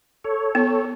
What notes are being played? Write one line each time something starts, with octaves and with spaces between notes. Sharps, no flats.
A4 C#5
B3